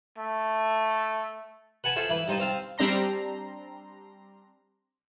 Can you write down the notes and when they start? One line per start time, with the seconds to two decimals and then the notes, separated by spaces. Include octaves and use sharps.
0.18 A3
1.84 B4 F#5 G#5 A5
1.96 F4 G#4 A4 C5 E5
2.09 E3 E4 B4
2.28 G2 D#4 C5 D#5 A5
2.40 C4 F5 A5
2.78 G3 C4 D4 A#5 C6